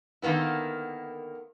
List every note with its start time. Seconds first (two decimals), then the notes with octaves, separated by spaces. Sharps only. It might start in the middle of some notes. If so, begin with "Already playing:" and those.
0.22 D3 D#3 A#3 B3 E4